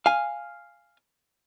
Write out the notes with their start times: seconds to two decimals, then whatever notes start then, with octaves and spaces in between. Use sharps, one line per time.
0.06 F5 G#5